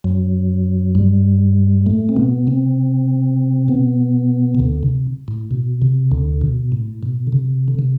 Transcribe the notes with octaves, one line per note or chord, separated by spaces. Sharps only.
F#2 F#3
G2 G3
A2 A3
C4
B2 B3
C3 C4
B2 B3
C3
D2 D3
C3
A2
B2
C3
D2 D3
B2
A2
B2
D3
C3
D3
C3